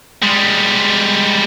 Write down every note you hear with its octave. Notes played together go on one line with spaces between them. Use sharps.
G3 G#3